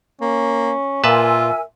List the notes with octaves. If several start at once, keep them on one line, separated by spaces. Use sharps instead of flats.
A#3 C#4
A#2 F4 A#4 B4 E5 G#5 A5 E6